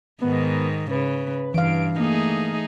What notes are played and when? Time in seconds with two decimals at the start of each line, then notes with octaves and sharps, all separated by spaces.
0.22 G#2 D#3 B3
0.91 C#3 B4
1.54 G2 E3 F5 D7
1.99 A3 A#3 D#4 G#4